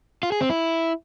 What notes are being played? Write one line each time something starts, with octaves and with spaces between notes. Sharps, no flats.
F4
G#4
C4
E4